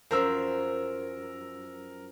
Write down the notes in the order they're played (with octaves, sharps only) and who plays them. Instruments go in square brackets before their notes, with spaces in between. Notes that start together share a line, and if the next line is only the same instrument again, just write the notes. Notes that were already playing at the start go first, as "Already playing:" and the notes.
[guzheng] F#2 F3 C5 [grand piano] A#4 E6